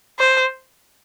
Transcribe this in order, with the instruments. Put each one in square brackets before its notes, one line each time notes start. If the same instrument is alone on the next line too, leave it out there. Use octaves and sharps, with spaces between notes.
[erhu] C5